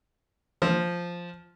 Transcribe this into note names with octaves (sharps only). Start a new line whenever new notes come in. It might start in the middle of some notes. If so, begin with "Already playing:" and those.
F3